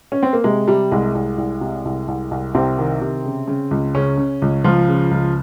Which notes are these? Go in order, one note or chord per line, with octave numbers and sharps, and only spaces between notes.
C#4
C4
A#3
C3 G#3
C3 G3
C2 G#3
C2
C2
C3
C2
C2
C2
C2 C3 C4
D#3
C3
C#3
C#3
C#2
C#3 C#4
C#3
C#2
C#2 F3 F4
C#3
C#2